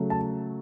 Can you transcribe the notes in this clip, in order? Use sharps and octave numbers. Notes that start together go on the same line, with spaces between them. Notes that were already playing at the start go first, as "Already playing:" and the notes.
Already playing: C#3 F#3 A3
A5